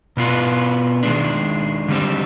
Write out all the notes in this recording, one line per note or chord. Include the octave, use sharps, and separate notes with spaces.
B2 B3 F4 B4
D#3 G#3 D4
D3 G3 C4